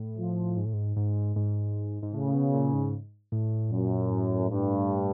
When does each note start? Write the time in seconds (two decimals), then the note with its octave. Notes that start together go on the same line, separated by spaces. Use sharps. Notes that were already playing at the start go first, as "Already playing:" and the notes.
Already playing: A2
0.19 F3
0.57 G#2
0.65 A2
0.73 G#2
0.96 G#2
1.36 G#2
2.03 G#2
2.14 A2 C#3
2.34 B2
2.54 A#2
2.73 G#2
3.32 A2
3.71 F#2 A#2
4.10 A2
4.50 G2